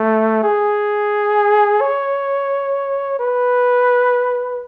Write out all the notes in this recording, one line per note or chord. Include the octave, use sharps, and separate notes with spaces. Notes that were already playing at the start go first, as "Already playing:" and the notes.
Already playing: A3
G#4
C#5
B4